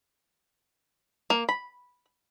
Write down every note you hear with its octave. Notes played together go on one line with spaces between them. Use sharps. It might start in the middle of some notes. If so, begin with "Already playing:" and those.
A#3
B5